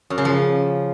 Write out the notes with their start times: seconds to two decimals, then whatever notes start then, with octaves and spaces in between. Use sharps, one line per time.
0.10 F#2
0.18 C#3
0.25 F3